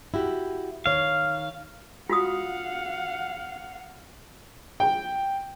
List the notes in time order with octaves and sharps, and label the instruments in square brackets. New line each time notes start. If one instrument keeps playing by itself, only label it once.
[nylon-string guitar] E4 F#4 G4
[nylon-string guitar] D#3 C#5 [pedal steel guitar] F5
[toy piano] F4 F#4 D#6 [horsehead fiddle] F5 F#5
[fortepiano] G5